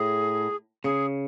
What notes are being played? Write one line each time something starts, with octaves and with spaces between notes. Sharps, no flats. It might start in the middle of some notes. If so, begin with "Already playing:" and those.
Already playing: A2 G#4
C#3 G#4